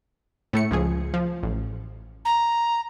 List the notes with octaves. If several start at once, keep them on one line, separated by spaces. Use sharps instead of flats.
A2 A3 C#7
C#2 F3 G#4
F3
A1
A#5